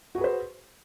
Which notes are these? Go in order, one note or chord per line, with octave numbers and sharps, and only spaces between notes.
F#4 G#4 B4 C5